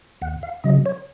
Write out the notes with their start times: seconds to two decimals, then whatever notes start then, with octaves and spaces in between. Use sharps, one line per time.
0.21 D#2 F#5
0.43 F5
0.64 C#3 F#3 D#5
0.86 C#5